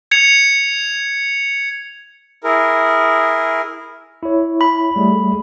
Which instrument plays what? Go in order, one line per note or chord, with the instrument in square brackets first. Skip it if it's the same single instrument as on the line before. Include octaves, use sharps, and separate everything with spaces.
[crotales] G#6 C#7 F7
[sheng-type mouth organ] E4 G#4 A#4
[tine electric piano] E4 C#5
[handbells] B5
[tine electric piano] G3 A3 G#4